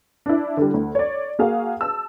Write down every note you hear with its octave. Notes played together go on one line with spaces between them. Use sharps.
D4 E4
D3 G3
D2
C#5 D5
A#3 F#4 G#4 F5
A5 E6